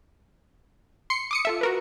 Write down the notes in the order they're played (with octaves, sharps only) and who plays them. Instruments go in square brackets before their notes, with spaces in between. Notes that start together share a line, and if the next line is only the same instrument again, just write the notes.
[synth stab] C6 C7 C#7
D6 D#6 C#7
F4 A4 E5
F#4 A#4 B4